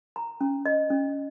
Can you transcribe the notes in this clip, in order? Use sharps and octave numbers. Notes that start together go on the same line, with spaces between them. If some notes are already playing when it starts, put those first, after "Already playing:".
A#5
C#4
D#5
C#4